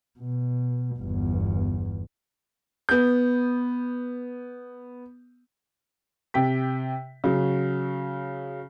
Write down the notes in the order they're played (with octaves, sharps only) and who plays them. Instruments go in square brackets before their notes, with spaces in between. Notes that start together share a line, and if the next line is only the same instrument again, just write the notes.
[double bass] B2
G1 E2
[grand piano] B3 G6
[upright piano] C3 G5 B6
C#3 F#3